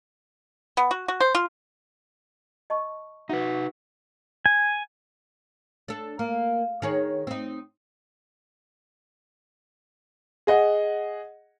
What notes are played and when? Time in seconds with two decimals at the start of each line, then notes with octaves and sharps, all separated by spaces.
0.77 B3
0.91 F#4
1.08 F#4
1.20 C5
1.35 F4
2.70 D#5 A5 C#6
3.29 D#4 F#4 B4 E5
4.46 G#5
5.88 D4 A4
6.19 A#3
6.82 D#3 G#4 C#5
7.27 C4 D#4
10.47 G#4 D#5 F#5